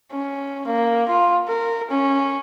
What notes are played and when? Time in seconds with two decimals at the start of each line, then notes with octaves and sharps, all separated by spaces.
0.12 C#4
0.67 A#3
1.08 F4
1.48 A#4
1.91 C#4